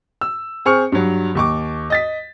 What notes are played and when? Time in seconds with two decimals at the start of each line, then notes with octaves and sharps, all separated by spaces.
0.21 E6
0.65 C4 G#4 C5 C#6 F6 C#7
0.92 G2 F#3
1.35 D#2 C#6 D6
1.90 D#5 A6 B6